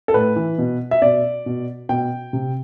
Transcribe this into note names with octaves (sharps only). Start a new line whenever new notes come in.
A4
A2 B4
E3
B2
E5
B2 D5
B2
B2 G5
C3